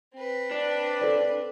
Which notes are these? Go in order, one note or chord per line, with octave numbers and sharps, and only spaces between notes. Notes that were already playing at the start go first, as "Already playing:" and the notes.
C4 B4
D4
A4 C5 D5